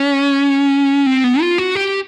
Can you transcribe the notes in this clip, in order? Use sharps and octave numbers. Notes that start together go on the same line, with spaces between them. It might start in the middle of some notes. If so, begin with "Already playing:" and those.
Already playing: C#4
C4
B3
F4
F#4
G4